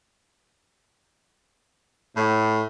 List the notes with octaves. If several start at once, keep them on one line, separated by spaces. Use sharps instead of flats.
A2